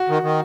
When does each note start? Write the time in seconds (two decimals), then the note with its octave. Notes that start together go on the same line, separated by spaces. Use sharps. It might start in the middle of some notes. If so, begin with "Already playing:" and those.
Already playing: F#4
0.09 D#3
0.23 D#3